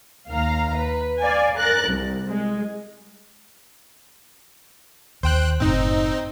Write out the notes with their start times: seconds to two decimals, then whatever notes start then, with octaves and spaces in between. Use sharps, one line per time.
0.30 D#2 F5 A#5
0.78 B4
1.20 D5 F5 G#5
1.57 A#4 F#6 A6
1.90 C2
2.27 G#3
5.23 D#2 C5 G5 F#6
5.60 F#1 A2 C4 D#4